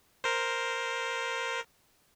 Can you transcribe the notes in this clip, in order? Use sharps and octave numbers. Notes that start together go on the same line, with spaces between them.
A#4 C5